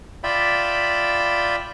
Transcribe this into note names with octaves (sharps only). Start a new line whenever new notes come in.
F4 D5 E5 G5 B5